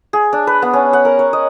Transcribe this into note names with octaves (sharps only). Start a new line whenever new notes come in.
G#4
D4
B4
B3
C#4
F#5
A#4
C#5
D#5